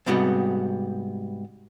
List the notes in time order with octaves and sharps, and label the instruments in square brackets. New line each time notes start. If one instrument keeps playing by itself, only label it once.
[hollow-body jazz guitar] G#2 C3 G3 B3 F#4 D#5